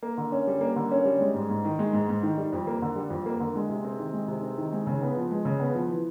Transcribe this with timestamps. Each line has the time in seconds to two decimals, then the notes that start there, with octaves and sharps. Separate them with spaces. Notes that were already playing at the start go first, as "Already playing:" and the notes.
0.03 A#3
0.18 D3
0.32 C#4
0.47 G3
0.61 A#3
0.76 D3
0.91 C#4
1.05 G3
1.21 G#3
1.34 G#2
1.50 G#2
1.65 D#3
1.79 G#3
1.93 G#2
2.09 G#2
2.23 D#3
2.38 G3
2.53 F2
2.67 A#3
2.82 D3
2.96 G3
3.10 F2
3.26 A#3
3.40 D3
3.56 G#3
3.69 C3
3.84 C4
3.99 D#3
4.13 G#3
4.28 C3
4.43 C4
4.58 D#3
4.73 G#3
4.87 C#3
5.02 B3
5.17 F3
5.31 G#3
5.45 C#3
5.60 B3
5.75 F3
5.89 E3